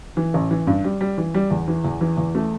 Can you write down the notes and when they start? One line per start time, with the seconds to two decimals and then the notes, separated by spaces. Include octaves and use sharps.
0.17 E3
0.34 A1
0.51 E3
0.67 G2
0.84 G3
1.01 G3
1.18 E3
1.34 G3
1.51 E2
1.68 E3
1.85 E2
2.01 E3
2.17 E2
2.35 A3